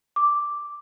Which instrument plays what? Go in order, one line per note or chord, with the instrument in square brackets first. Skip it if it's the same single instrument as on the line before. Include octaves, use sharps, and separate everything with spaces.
[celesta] D6